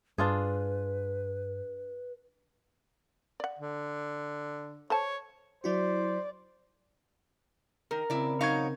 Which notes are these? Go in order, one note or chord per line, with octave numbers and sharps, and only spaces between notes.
G2 D4 F4 G#4 B4
D5 F#5
D3
A4 C5 C#5 A5
F#3 E4 F#4 C5 D5
D#3 A#4
C#3 C4 E4 D5
F#3 D#4 C#5 F5 C#6 G#6